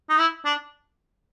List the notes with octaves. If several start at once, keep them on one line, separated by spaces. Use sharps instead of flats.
D#4
E4
D4